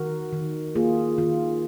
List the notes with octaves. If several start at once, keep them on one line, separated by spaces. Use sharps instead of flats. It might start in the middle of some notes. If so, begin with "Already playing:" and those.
Already playing: D#3 F#4 A#4
D#3
A#3 F4 G#4
D#3 F4